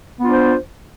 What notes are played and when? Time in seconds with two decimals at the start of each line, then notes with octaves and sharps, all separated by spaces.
0.20 B3
0.23 F4
0.26 D4
0.29 C5